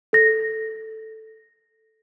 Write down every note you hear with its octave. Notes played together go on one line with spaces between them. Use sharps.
A4 A#6